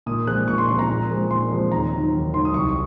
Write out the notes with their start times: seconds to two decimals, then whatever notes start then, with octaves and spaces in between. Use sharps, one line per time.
0.06 A#2 D#6
0.27 F3 G#3 C4 F#6
0.48 A#2 C#6
0.58 C6
0.69 F3 G#3 C4 C6
0.79 A#5
0.89 A#2
1.10 F3 G#3 C4
1.30 A#2 C6
1.51 F3 G#3 C4
1.72 D#2 A#5
1.92 D#3 F#3
2.13 D#2
2.34 D#3 C6
2.37 F#3
2.45 D#6
2.54 C2 C#6